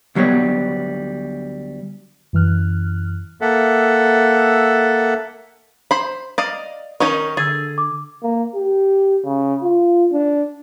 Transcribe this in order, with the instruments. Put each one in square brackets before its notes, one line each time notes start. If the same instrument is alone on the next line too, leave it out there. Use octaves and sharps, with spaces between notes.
[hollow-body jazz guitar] D2 F#3 G3 B3 C#5
[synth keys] F#2 E3 F6 F#6
[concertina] A#3 A4 E5 F#5
[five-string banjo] C5 B5
D5 D#5 F5
[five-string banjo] D#3 C#4 D#4 [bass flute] A#4 [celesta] C#6
[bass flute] D3 [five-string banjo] G#4 [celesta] E6 G#6 A6
[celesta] D6
[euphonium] A#3
G4
C#3
F4
D4